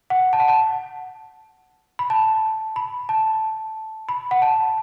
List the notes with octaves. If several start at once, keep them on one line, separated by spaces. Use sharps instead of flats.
F#5
A5
F#5
A5
B5
A5
B5
A5
B5
F#5
A5